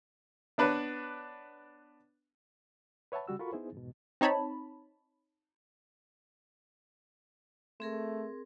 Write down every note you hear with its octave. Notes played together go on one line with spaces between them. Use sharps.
B3 D4 B4 C#5
B4 C#5 E5 F#5 A5 B5
C#3 G3 F#4 E6
F4 F#4 A4 A#4 B5 C#6
B3 D#4 E4 G#4 C5
E2 G#2 B2
C4 D#4 C#5 A5 B5
A3 C4 G#4 A#4